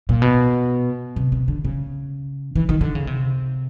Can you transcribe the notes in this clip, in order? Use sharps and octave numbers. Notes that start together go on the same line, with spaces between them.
A#2
B2
C3
C3
D3
C#3
E3
D#3
D3
C#3
C3